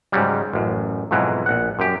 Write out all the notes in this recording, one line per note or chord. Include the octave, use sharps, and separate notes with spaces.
G#2 C#3 F#3 G3
A1 F#2
F2 G#2 B2 E3 F#3
A#1 F#5
F#2 G4